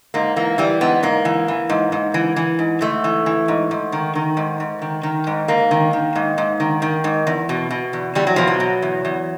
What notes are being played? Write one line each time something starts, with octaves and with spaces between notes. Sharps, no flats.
G#2 A#3
E3 A#3
E3 G3
G#2 B3
G#2 A#3
E3
E3
G#2
G#2
E3
E3
G#2
G#2 A3
E3
E3
G#2
G#2
D#3
D#3
G#2
G#2
D#3
D#3
G#2
G#2 A#3
D#3
D#3
G#2
G#2
D#3
D#3
G#2
E2
B2
B2
E2
E2 G3
F#3
B2 F3
F#3
B2
E2
E2